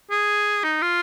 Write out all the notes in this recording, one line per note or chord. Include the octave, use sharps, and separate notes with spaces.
G#4
D#4
F4